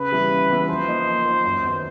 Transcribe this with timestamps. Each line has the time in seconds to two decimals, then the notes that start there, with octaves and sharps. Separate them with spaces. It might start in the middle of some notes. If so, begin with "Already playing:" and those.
Already playing: C#3 B4
0.12 E3 G3 B3 E4
0.31 C#3
0.50 E3 G3 B3 E4
0.69 F3 C5
0.88 A#3 D#4
1.07 F3
1.25 A#3 D#4
1.44 F#2
1.63 D#3 F#3 B3